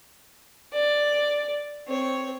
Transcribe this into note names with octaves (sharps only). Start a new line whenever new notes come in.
D5
C4 C#5